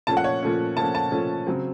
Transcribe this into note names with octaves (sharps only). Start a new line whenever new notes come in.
A#2 F3 A3 C#4 A5
F#5
C#5
A#2 F3 A3 C#4
A#2 F3 A3 C#4 A5
A5
A#2 F3 A3 C#4
C#3 F#3 C4